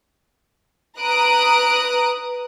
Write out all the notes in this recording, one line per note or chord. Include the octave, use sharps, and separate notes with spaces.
B4 A#5 D#6 F#6 D7